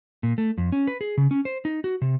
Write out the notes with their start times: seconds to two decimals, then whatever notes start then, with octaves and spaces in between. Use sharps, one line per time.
0.23 A#2
0.38 A3
0.58 F2
0.72 C#4
0.87 B4
1.01 G#4
1.17 C#3
1.31 C#4
1.45 C5
1.65 D#4
1.84 F#4
2.02 C3